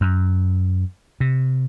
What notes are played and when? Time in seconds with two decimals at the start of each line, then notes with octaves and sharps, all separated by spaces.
0.01 F#2
1.20 C3